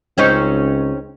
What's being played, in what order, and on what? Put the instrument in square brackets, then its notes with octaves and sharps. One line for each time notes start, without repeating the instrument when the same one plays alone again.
[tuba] C#2 [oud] C4 C#4 D#4